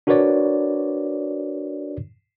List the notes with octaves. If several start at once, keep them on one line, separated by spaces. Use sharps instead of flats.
D4 F#4 A#4 B4 C#5 D5